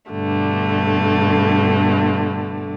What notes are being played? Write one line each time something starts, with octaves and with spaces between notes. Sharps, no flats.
G2 B2 D3 A3